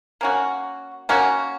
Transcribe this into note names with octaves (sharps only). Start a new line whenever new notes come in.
A#3 C#4 F#4
A#3 C#4 F#4